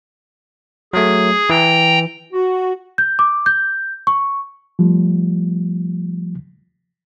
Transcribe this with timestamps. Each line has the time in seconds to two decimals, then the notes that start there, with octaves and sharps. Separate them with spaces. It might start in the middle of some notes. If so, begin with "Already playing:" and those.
0.93 F#3 A3 G#4
1.50 E3 G5 A#5
2.33 F#4
2.98 G6
3.19 D6
3.46 G6
4.07 C#6
4.79 F3 G3 A3